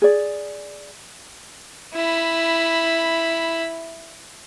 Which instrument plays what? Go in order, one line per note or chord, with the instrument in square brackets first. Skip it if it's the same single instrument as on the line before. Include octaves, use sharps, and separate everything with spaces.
[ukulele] G#4 D5
[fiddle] E4 B5